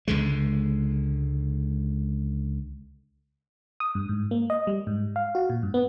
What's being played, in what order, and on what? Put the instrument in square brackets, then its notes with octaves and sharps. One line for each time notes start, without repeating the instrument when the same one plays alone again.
[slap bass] C#2 D3 G#3
[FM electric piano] D#6
G2
G#2
A#3
D#5
G3
G#2
F5
F#4
A#2
G2
B3